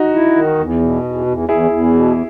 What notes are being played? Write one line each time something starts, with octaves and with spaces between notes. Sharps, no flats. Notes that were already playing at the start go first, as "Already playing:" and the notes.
Already playing: D#4 F#4
E4
D#3
E2
B2
E2
E2
E2 E4 G#4
E2
B2